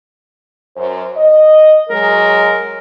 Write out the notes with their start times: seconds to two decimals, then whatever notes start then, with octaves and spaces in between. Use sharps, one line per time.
0.76 F#2 C5
1.15 D#5
1.89 F#3 G#3 A#4